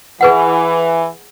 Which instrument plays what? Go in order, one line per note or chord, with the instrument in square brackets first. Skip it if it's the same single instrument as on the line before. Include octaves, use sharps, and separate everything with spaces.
[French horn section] E3 [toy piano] G#4 B4 F#5